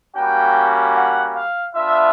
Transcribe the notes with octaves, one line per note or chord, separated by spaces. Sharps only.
G3 A#3 C#4 F#4 G5
F#5
F5
B3 D4 F4 E5